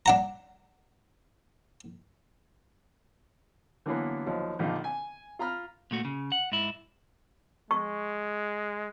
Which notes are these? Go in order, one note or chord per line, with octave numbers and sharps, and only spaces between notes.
D4 F#5 A#5
D3 E3 F#3 A#3 B3
D#2 F3 F#3
A#1 D3 D#3 D#4 F4
G#5
F4 A#5 B5 F6
A#2 A3 F#4
C#3
F#5
G#2 E4
G#3 C#6